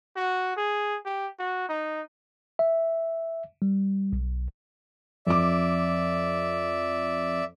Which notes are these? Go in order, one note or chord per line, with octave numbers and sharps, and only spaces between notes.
F#4
G#4
G4
F#4
D#4
E5
G3
B1
F2 D5 E5 D6